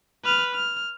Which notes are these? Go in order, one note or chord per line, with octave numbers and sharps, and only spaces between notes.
B4 F6
F6